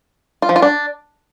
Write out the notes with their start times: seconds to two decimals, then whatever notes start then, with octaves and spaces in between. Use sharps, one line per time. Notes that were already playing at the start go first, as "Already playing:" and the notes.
0.42 F4
0.49 F3
0.56 F4
0.62 D4